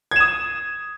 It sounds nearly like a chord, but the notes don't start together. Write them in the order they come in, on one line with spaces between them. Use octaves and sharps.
G#6 E7 D#6